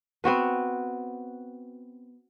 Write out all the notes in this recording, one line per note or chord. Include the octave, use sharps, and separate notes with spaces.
B3 C4 F#4 B4